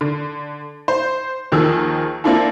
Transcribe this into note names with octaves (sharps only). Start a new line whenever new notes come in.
D3
C5
D#2 D#3 F3 D#4 G#4 E6
A#3 C4 D4 E4 F4 A4